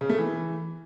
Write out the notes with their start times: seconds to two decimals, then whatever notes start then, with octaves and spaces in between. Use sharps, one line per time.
0.01 C#3
0.10 A3
0.18 E3